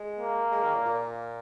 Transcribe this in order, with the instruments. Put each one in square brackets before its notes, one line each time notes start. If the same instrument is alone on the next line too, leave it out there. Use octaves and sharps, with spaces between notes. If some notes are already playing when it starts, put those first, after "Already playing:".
Already playing: [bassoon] G#3
[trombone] A#3
[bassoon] G#3
D#3
A#2
A#2